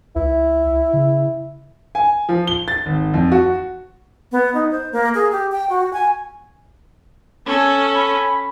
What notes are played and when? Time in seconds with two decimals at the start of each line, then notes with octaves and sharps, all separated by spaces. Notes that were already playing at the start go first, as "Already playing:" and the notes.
0.16 C#2 E4
0.93 C#3
1.95 G#5
2.29 F3
2.47 G7
2.68 A6
2.86 G#1
3.14 F2
3.32 F#4
4.32 B3
4.54 D#4
4.71 C5
4.92 A#3
5.15 G#4
5.32 G4
5.52 G5
5.70 F#4
5.93 G#5
7.48 C#4 A4
7.96 B5